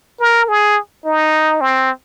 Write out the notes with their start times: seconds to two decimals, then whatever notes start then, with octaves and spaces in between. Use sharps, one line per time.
0.20 A#4
0.48 G#4
1.05 D#4
1.61 C4